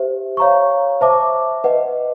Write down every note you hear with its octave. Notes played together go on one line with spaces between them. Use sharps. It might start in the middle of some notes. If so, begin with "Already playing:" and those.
Already playing: G4 C5 E5
C#5 F5 A#5 C#6
C5 E5 A5 D6
B4 D#5 F#5